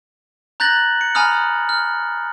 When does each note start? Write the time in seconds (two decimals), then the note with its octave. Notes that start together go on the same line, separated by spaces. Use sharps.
0.60 A#5 F#6 G6 A6 A#6 F#7
1.01 C#7
1.15 G#5 A#5 B5 D#6 F6
1.69 F6